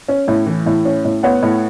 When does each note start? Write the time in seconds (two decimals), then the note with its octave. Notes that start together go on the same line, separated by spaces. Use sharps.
0.08 C#4
0.28 A2
0.46 E3
0.66 A2
0.85 C#4
1.05 A2
1.23 B3 C#5 F#5
1.43 A2